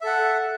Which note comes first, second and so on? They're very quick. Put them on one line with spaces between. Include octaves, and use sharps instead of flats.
E5 A4 F#5